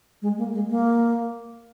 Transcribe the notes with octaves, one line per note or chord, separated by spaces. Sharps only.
G#3
A#3
G#3
A#3